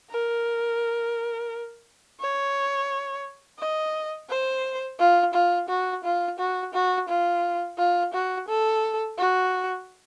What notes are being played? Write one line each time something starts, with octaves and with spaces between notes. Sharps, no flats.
A#4
C#5
D#5
C5
F4
F4
F#4
F4
F#4
F#4
F4
F4
F#4
A4
F#4